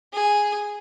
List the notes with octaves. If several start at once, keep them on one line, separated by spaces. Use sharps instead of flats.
G#4